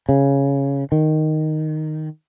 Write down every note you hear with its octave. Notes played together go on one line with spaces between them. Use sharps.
C#3
D#3